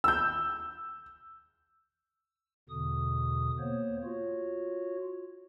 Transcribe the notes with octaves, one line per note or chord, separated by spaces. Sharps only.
E6 G6
E2 B2 D3 D#6
A#3 B3 C5 C#5
F4 F#4 C#5